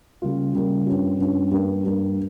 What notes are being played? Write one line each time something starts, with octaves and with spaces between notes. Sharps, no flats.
C#3 G3 A#3 F4
C#3 G3 A#3 F4
G2 G3 C#4 F4
G2 G3 C#4 F4
G2 G3 A#3
G2 G3 A#3